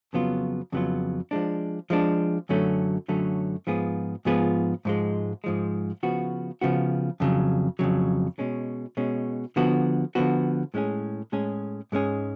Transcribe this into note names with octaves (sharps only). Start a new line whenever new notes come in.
F2 C#3 F#3 B3 F4
F2 C#3 F#3 B3 F4
F3 G#3 D4
F3 G#3 D4
F#2 D3 F#3 A3 C#4
F#2 D3 F#3 A3 C#4
G#2 F3 B3 F4 G#4
G#2 F3 B3 F4 G#4
G#2 F3 G#3
G#2 F3 G#3
C#3 F3 B3 F#4
C#3 F3 B3 F#4
F2 C#3 F#3
F2 C#3 F#3
B2 G#3 C#4
B2 G#3 C#4
D3 F3 B3 F#4
D3 F3 B3 F#4
A2 G#3 C#4 G#4
A2 G#3 C#4 G#4
G#2 G#3 C#4 G#4